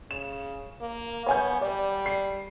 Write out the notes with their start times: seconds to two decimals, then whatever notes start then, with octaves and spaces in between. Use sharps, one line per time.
0.11 C#3 E7
0.81 A#3
1.26 B3 C#5 G#5 G6
1.61 G3 D5
2.06 C7